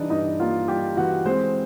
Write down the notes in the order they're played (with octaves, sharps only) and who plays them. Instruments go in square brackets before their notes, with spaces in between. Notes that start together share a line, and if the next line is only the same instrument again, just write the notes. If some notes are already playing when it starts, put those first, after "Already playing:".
Already playing: [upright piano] E3 G3 D4 D#4 D5 D#5
G2 D#4 D#5
A#3 F4 F5
G3 G4 G5
E3 F#4 F#5
G#3 C4 C5